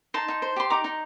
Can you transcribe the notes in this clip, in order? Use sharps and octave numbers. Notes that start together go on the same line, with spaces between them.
D#4 A5 C6
D#4
C5
G4 C6
D#4 A#5 D6
D#4